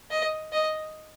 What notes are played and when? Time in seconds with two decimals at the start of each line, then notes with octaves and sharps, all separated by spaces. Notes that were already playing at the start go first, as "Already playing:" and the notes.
0.11 D#5
0.53 D#5